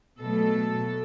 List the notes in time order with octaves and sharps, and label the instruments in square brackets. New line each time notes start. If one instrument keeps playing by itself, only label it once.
[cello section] B2 F#3 A3 A4